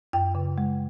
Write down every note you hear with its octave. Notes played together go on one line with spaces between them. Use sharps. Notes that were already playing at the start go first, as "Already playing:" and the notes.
F#2 G5
C#3
G#3